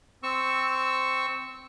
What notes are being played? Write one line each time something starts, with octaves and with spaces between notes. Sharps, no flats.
C4 C#6 E6